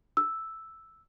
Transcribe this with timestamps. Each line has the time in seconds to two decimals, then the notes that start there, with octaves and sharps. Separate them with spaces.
0.17 E6